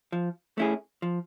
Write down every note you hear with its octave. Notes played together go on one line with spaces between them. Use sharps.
F3
A3 C#4 E4 G#4
F3